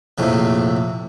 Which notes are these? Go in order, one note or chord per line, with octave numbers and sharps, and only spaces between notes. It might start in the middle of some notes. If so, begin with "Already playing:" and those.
A#1 F2 A2 C3